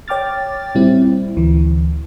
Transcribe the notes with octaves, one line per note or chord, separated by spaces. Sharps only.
C#5 G5 D6 F6 A6
A#2 G3 C4 E4
D2 E3